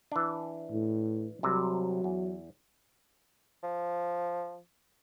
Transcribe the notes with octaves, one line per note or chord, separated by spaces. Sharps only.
E3 D4
A2
C2 C3 F#3
E2
F3